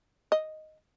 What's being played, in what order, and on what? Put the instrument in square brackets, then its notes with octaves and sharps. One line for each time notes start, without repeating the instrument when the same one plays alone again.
[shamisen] D#5